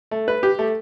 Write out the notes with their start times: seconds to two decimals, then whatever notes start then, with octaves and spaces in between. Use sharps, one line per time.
0.11 A3
0.28 B4
0.43 G4
0.59 A3